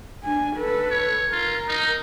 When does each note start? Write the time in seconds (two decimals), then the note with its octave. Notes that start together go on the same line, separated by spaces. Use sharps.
0.24 D4 G#5
0.56 A4 B4
0.91 C#5
1.32 F4 A#4
1.68 D#4